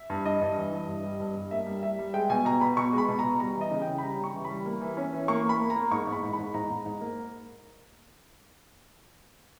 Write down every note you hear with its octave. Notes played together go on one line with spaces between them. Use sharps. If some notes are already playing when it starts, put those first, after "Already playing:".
Already playing: E5
G2
G2 D#5
G2
E3
G2
G2
G3
G2
G2
A#3 E5
G3
G3 E5
G3
G#3 G5
B2 G#5
B2 A#5
B2 B5
B2 C#6
G#3 B5
B2
A#5
B2
G3 A#5
E3
D#5
C#3
G5
C#3
B5
G3 A#5
C#3
C#6
E3
B5
G3
A#3
E3
C#4
E3
A#3 C#6
A#3
B5
A#3
A#5
A#3
G#2 C#6
G#2
B5
G#2
G#2 B5
G#2 A#5
G#2
G#2
A#3